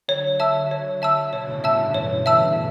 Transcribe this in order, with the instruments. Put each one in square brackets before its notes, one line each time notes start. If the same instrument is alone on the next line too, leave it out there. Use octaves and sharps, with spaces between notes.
[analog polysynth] D3 F#3 [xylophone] C#5
[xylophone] E5 A5 E6
C#5
E5 A5 E6
[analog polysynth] B2 D3 [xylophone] C#5
[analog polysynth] A2 C#3
[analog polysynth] G2 B2 [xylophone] E5 A5 E6
[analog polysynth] A2 C#3
[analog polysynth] C#3 E3 [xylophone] C#5
[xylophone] E5 A5 E6